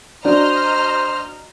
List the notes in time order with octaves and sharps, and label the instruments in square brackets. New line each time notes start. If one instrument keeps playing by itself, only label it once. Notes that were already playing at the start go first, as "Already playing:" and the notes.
[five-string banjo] D4 [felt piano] F#4 [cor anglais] C5 [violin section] D#5 A#5 F6